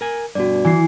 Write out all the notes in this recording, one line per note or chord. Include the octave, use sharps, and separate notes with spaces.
A#4 G#5
G2 B2 F#4 D5
E3 G#5 C7